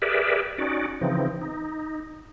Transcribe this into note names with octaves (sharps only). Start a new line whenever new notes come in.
G4 G#4 A#4 B4 D5 E5
C#4 D#4 F#4 D5
C#3 E3 F3 C4 D#4
D#4